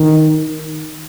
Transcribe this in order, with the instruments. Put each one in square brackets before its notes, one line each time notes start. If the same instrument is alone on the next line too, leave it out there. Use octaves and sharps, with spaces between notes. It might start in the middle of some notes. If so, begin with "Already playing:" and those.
Already playing: [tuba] D#3